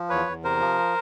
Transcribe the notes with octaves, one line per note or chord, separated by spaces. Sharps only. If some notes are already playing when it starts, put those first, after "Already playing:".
Already playing: F3
E2 B4 C#5
E2
C3 A#4 C5
F3